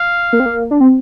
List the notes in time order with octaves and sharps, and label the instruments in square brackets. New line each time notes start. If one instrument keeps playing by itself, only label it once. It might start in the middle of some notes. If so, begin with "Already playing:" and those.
Already playing: [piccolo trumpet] F5
[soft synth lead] A#3
C4
A#3
D4
C4